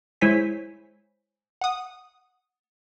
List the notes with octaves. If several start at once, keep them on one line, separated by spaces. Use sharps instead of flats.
G#3 E4 C5 C#5 G#5 B6
F#5 D#6